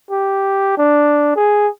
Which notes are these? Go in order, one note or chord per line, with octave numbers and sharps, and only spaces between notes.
G4
D4
G#4